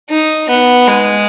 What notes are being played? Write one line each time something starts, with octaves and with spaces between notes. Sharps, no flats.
D#4
B3
G#3